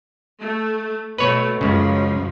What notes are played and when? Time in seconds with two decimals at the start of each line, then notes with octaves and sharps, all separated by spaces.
0.40 A3
1.18 B2 A3 B4 C#5
1.61 C#2 F#2 C#3 F3 F#3